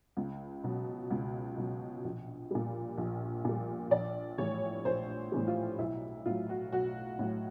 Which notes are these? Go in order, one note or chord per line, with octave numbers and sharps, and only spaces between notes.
C#2
B2 F#3
C#2
B2 F#3
A#1
A#2 G3
A#1
A#2 G3
A#1 D5
A2 E3 G3 C#5
A#1 C5
A2 E3 G3
F4
B1 E4
A2 F#3 F4
F#4
B1 F#4
A2 F#3